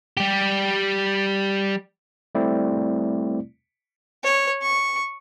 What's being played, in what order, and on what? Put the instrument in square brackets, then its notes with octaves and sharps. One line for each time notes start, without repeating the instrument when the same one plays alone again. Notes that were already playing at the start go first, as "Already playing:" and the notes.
[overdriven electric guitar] G3 G4
[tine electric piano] G3 A3 C4 E4 D5
[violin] C#5
C#6